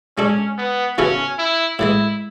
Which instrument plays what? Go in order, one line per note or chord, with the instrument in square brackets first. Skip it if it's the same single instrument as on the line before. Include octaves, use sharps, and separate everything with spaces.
[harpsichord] G#3 D4 A4 [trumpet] C#4
[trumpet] B3
[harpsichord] C#3 E3 B3 F#4 A4 [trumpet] C#4
[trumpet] E4
[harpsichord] A2 E3 G#3 [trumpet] E4